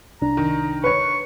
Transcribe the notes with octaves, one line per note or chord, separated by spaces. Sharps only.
C2 D4 A#5
D#3
B4 C#5 C#6